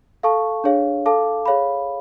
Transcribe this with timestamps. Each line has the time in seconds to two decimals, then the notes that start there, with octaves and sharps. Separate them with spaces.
0.23 A4 F5 A5 C#6
0.64 D4 G#4 C#5 F5
1.06 A4 F5 A5 D6
1.46 G#4 C#5 F5 B5